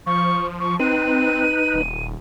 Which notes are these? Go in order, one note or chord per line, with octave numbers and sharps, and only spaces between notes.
F3 C#6
F3 C#6
C4 D#4 B4 D#7
D#1